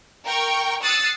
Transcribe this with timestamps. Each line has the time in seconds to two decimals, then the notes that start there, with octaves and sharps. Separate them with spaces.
0.25 A#4 G5 C#6
0.83 D#6 E6 F#6 A6 C7 C#7